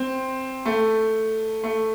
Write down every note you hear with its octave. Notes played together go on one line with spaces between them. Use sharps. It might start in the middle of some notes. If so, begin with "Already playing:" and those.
Already playing: C4
A3
A3